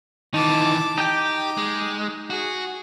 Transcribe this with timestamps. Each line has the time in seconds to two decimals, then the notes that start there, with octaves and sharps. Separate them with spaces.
0.34 D#3 E3 D#4 A5 D6
0.98 D#4 G4 G5 D6
1.57 G#3
2.30 F#4 G#4